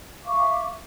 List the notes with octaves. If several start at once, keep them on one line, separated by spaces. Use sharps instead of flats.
E5 F5 C#6 D6